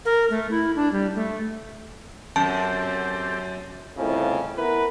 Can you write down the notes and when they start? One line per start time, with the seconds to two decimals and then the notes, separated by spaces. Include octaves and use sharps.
0.05 A#4
0.30 A3
0.51 E4
0.76 D4
0.92 G3
1.15 A3
2.36 F#2 C4 G4 A4 A5
3.98 C2 F2 A2 C#3
4.57 B3 E4 A#4 B4